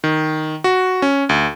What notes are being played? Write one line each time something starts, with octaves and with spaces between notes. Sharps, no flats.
D#3
F#4
C#4
D2